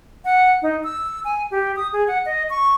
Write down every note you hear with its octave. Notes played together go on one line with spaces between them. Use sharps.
F#5
D#4
E6
G#5
G4
D#6
G#4
F#5
D#5
C#6